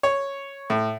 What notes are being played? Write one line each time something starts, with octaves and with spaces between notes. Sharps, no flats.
C#5
A2